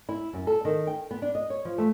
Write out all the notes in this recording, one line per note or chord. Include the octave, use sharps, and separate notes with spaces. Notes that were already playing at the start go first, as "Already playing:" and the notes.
E4
F#2
A4
D#3
G5
B3
D4
D#5
C#5
F3
A3